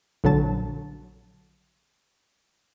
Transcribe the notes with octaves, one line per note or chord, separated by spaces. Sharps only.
A#1 D3 F#3 A5